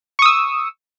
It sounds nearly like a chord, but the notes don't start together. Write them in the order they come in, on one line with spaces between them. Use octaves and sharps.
C#6 D#6 E6